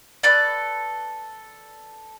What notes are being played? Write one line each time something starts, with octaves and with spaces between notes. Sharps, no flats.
A4 B4 D5